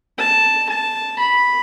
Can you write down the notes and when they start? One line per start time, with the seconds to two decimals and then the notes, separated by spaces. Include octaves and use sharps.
0.19 A5
0.69 A5
1.19 B5